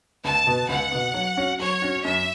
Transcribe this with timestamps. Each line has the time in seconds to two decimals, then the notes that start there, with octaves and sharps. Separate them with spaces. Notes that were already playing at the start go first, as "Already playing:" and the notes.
0.24 C#2 A5
0.47 B2 B3
0.69 C#2 F#5
0.92 B2 B3
1.14 F#3
1.37 C#4 F#4
1.60 F#3 C#5
1.82 C#4 F#4
2.04 F#2 E5